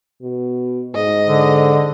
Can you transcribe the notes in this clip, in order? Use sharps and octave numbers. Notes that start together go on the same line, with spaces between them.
B2
G#2 D#5
D3